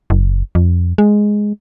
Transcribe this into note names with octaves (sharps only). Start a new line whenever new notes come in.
F#1
F2
G#3